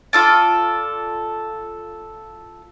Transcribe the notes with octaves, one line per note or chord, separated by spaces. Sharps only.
F4 A4 D5